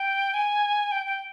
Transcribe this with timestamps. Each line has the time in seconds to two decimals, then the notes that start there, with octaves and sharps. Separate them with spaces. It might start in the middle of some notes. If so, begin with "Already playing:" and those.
Already playing: G5
0.34 G#5
0.92 G5
1.06 G5